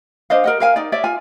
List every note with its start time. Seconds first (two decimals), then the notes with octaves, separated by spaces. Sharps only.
0.30 D4 C5 D#5 F5
0.44 A#4 D#5 F#5
0.60 A#4 F5 G#5
0.76 D#4 D5
0.92 C#5 D5 E5
1.04 F4 G#5